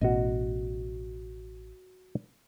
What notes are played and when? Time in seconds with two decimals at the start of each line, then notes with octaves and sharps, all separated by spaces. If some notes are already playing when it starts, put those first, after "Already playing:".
0.01 A1 B2 F#4 D#5